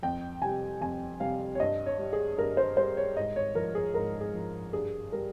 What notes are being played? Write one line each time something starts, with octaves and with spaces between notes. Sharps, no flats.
F2 G5
C3 G3 G#5
F2 G#5
C3 G3 F5
C#5
G2 D#5
C#5
G3
G#4
G2 A#4
C5
G3 C5
C#5
G#2 D#5
C#5
F3 A#4
G#4
G#2 A#4
G#4
F3
G2 G#4
G3 A#4